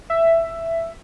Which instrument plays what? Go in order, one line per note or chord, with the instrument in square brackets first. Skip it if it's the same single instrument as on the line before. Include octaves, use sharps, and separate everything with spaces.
[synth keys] E5